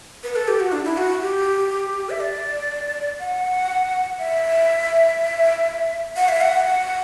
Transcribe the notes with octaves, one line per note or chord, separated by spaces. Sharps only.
B4
A4
G4
F#4
D4
E4
F#4
G4
E5
D5
F#5
E5
F#5
E5
F#5